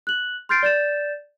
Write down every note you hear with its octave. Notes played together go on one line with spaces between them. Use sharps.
F#6 F#7
C6 F6 G6 A6 C7 D7
D5 G6 A6 E7